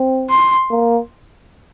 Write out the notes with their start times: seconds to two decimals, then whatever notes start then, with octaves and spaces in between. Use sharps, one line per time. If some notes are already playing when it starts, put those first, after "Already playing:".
Already playing: C4
0.30 C6
0.71 A#3